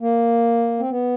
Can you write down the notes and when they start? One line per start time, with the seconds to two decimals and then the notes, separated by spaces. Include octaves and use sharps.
0.01 A#3
0.79 C4
0.90 B3